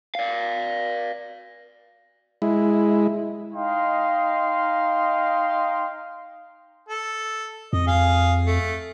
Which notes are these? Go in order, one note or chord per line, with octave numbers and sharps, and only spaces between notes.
D5 F5
G#3 E4
D#4 D#5 F5 G5 C6
A4
F2 D#5
G#4 F5
A3